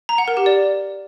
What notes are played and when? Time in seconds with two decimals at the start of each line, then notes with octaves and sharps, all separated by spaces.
0.09 A#5
0.18 F#5
0.28 A#4
0.37 G4
0.46 D5